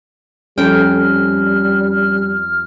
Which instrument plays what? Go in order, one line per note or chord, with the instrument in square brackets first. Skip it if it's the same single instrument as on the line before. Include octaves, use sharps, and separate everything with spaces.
[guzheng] F2 G5 [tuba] G3 [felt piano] C#4 [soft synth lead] F6